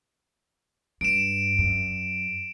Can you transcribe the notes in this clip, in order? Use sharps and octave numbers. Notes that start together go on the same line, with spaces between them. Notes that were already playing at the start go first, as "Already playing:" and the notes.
G2 D7 E7
F#2